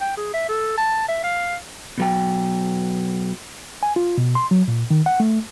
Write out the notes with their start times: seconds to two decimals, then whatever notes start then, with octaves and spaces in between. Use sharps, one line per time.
0.01 G5
0.17 G#4
0.33 E5
0.49 A4
0.77 A5
1.08 E5
1.23 F5
1.98 B2 F#3 G5
3.83 G#5
3.96 F4
4.18 B2
4.35 C6
4.51 F#3
4.68 A#2
4.91 D#3
5.06 F#5
5.20 A3